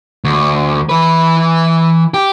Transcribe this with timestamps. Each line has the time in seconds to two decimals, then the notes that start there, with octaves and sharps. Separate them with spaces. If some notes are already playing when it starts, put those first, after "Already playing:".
0.24 D2
0.89 E3 B4
2.14 G4